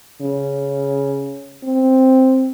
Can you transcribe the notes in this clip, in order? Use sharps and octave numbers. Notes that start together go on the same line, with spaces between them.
C#3
C4